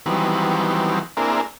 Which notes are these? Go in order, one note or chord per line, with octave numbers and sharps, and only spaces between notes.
D#3 E3 F#3 G3 B3 C4
A#3 C4 D4 E4 G#4 A#4